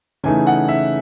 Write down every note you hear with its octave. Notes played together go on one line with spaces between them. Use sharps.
C#3 E3 A3 D#4 G#5
F#5
E5